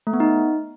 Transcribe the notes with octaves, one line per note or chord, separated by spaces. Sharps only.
A3
B3
D#4